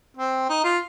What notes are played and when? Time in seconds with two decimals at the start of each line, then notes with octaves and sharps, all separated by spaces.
0.17 C4
0.49 D#4
0.64 F4